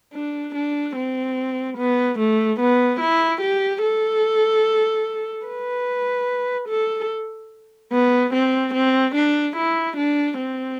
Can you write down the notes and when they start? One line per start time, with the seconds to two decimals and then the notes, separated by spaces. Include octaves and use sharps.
0.13 D4
0.55 D4
0.96 C4
1.78 B3
2.19 A3
2.60 B3
3.00 E4
3.41 G4
3.82 A4
5.47 B4
6.68 A4
7.92 B3
8.33 C4
8.74 C4
9.15 D4
9.56 E4
9.97 D4
10.38 C4